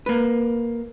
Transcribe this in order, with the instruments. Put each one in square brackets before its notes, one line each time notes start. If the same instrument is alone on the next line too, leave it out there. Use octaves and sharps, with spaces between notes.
[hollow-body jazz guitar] A#3 B4